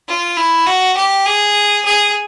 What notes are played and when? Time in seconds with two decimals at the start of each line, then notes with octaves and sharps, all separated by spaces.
0.08 F4
0.37 E4
0.66 F#4
0.97 G4
1.26 G#4
1.85 G#4